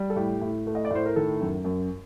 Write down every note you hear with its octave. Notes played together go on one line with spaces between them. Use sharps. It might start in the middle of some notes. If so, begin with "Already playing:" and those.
Already playing: G3
A4
A2 G4
A2
A3
D#5
D5
A2 C5
A#4
D#3 A4
F#2
F#2